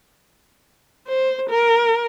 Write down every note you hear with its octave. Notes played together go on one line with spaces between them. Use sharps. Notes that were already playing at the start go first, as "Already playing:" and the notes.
C5
A#4